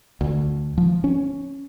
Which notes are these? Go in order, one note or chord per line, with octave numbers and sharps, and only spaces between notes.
D2
F3
C#4